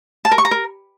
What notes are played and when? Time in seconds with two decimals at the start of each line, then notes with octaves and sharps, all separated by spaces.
0.25 A5
0.32 A#4
0.38 C#6
0.45 A#5
0.51 A#4